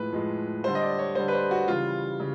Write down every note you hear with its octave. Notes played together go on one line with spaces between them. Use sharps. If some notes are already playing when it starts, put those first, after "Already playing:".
Already playing: A2 F3 G#3 B4
A2 F3 G#3
D3 G3 C5
D#5
D5
C#5
D3 G3 C5
B4
C5
F#4
C#3 E3 G3 F4
C#3